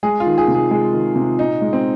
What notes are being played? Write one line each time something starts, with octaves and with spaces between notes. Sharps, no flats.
G#3 G#4
F4
D#3
G#4
C3
G#4
G#3 G#4
D#3
C3
A#2 D#4
G#3
C4